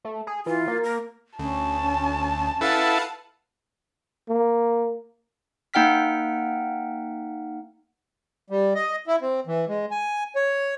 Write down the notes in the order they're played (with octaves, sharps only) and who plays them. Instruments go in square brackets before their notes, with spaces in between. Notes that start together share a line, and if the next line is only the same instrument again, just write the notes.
[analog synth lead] A3
G#4
[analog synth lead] E3 [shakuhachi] F4
[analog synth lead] A#3
[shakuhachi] A#4
[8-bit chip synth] D2 [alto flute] C#4 [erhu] A5
[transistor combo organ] E4 A4 [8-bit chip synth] B4 F5 F#5
[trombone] A#3
[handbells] A#3 D#4 F#5 G5 F6 B6
[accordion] G3
D#5
E4
C4
E3
G#3
G#5
C#5